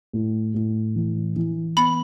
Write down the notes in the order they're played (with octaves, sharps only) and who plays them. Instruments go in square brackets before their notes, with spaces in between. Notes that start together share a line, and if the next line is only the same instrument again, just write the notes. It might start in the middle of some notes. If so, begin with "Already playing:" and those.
[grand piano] A2
A2
E3
E3
[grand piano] B3 [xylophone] B5